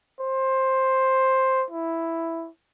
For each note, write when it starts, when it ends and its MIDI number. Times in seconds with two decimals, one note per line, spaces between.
0.20 1.65 72
1.70 2.49 64